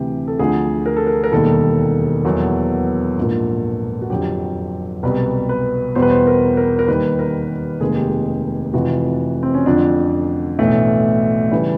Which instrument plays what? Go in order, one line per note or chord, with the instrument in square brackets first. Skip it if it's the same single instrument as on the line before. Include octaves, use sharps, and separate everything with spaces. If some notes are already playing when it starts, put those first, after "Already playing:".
Already playing: [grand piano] D2 C3 E3 G4
A4
D2 D3 F3 G#4
A#4
A4
A#4
A#4
E1 D#2 D#3 G3 A4
E2 B2 F#3 A#3
A#1 G#2 F3 A#3
F#4
F2 D3 F#3 G4
C2 B2 G3 B4
B4
E2 B2 G3 C5
B4
C5
A#4
A#4
A#4
D#2 D#3 G3 B4
A#4
F1 D#2 D#3 G#3 G#4
G4
G#4
F1 F2 C3 E3 F#4
C4
C#4
F2 D3 F3 D4
B1 A2 E3 A3
C#3 E3 G3